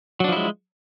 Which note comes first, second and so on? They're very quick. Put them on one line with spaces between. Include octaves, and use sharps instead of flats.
F#3 D4 F3 E4 G#3